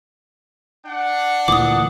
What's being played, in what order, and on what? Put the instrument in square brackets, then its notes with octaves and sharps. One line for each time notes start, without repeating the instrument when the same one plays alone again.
[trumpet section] D4 F#5
[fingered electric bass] D2 A#2 E3 [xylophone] D6 D#6